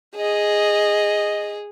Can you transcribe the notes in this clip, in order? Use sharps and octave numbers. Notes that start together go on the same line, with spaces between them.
G#4 D#5